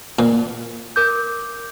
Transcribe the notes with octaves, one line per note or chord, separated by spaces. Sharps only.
A#2
A#4 D6 G6